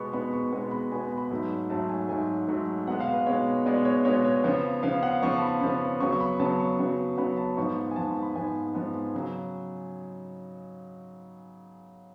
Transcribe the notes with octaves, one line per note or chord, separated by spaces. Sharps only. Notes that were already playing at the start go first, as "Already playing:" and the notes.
Already playing: B2 G#3 B3 B5 C#6
B2 G#3 B3 B5
C#6
B2 G#3 B3 B5
B5
B2 G#3 B3 G#5
B5
B5
G#2 F#3 A3
G#2 F#3 A3 A5
G#5
G#2 F#3 A3 G#5
G#2 F#3 A3
B2 G#3 B3 F#5
F5
B4
B2 G#3 B3 C#5
B2 G#3 B3 D5
C#5
B2 G#3 B3 C#5
C#5
C#3 F3 B3
C#3 F3 B3 F5
F#5
C#3 F3 B3 C#6
A5
B5
C#3 F3 B3
C#3 F#3 B3 C#6
C#6
B5
C#3 F#3 B3 A5
C#6
C#3 F#3 B3
C#3 F#3 B3 B5
A5
G#2 F3 B3 C#6
G#5
G#2 F3 B3 A5
B5
B5
G#2 F3 B3 G#5
G#2 F3 B3
C#3 F#3